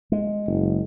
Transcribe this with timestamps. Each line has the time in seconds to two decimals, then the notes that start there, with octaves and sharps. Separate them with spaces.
0.12 G#3
0.46 F#1